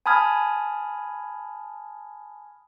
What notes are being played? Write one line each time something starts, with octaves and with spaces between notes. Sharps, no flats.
G#5 A5 B5 D#6 F6 G#6